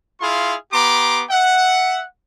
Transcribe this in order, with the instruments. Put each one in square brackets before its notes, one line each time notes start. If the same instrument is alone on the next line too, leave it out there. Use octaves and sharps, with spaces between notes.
[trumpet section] E4 F4 G#4 F5 C6
B3 G4 A#5 C6 D6
E5 F#5